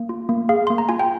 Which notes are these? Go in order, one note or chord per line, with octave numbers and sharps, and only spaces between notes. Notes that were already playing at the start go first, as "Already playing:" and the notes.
Already playing: A#3
F4
A#3
G#4 F5
A#3 C6
A#5
F4 G#5
G5